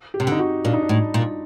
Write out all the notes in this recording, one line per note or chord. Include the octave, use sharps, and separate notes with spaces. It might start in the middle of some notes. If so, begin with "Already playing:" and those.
G4
C3
D3 D#4
F#4
A#2 D4
D#4
D4
A2
A#2